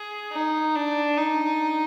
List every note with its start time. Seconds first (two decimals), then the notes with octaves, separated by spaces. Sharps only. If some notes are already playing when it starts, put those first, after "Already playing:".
Already playing: G#4
0.32 D#4
0.75 D4
1.18 D#4